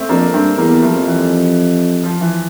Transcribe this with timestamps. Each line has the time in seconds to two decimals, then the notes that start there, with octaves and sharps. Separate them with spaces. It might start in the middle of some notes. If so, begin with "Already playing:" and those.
Already playing: A3 C4
0.09 F2 A#3 D4
0.33 G2 A3 C4
0.57 E2 G3 A#3
0.74 G3
0.82 F3 A3
0.94 F2
1.06 E3 G3
2.04 F3
2.21 E3